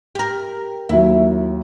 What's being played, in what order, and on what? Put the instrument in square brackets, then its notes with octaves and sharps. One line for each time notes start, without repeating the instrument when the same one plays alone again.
[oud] G4 A#4
[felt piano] D#2 F#3 [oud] E4